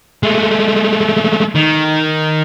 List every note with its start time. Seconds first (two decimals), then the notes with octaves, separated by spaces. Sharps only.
0.23 G#3 A3
1.55 D#3